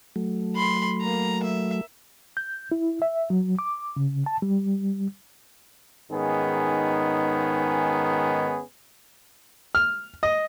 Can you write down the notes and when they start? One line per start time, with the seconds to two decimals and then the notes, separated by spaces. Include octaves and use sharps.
0.16 F#3 A3
0.56 B5 C6
1.01 A#3 A#5
1.44 E5
2.37 G6
2.72 E4
3.02 E5
3.30 F#3
3.59 D6
3.97 C#3
4.26 A5
4.42 G3
6.12 G#2 D#3 B3 C#4 D#4 G#4
9.75 F6
10.23 D#5